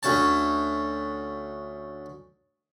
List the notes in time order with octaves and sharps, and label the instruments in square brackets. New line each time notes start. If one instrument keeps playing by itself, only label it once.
[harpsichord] D2 C#4 A5